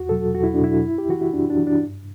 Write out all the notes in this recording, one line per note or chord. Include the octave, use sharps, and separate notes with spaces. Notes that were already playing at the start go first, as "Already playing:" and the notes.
Already playing: E2 F#4
B2 F#3 A4
E2 F#4
E4
D4
B2 F#3 E4
F#2
G4
E3 F#4
E4
F#2 D4
D4
E3
D4
G2